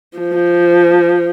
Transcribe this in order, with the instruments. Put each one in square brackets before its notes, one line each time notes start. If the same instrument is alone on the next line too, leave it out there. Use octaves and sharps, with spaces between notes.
[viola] F3